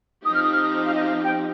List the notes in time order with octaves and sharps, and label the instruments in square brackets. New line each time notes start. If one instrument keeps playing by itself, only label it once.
[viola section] F3 C4 D#4 G4 [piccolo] D#6
[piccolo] F6
D#6
F6
D#6
F5
D#5
F5
G5